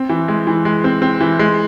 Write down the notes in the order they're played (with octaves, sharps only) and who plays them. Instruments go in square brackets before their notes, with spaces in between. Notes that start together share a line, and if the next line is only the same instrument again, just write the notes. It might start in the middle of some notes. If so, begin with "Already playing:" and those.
Already playing: [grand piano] C4
E3
G#3
E3
G#3
C4
C4
E3
G#3